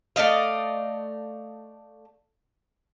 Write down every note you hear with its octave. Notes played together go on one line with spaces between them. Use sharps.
A3 D5 D#5 F5